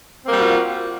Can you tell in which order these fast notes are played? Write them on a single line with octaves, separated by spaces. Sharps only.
C4 A#3 G3 F#4 F4